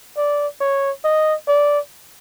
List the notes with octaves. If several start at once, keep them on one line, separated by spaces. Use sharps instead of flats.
D5
C#5
D#5
D5